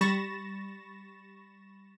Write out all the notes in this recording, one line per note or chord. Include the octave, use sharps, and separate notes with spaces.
G3 B5 C#6 A6 A#6 E7